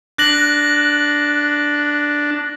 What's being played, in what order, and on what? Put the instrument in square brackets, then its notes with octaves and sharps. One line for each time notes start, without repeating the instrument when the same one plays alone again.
[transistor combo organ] D4 [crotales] F#6 A#6 F#7